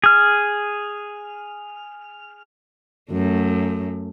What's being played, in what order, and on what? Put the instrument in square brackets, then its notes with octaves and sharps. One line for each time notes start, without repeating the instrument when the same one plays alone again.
[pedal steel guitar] G#4 F6
[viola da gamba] F#2 A3